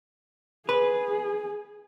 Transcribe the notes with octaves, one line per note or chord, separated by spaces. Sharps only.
G#4 B4